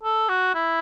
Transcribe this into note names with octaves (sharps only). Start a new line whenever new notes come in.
A4
F#4
E4